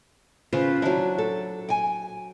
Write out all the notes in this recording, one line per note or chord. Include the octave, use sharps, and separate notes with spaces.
C#3 F4 B4 C5
F#3 D4 E4
A4
G5 G#5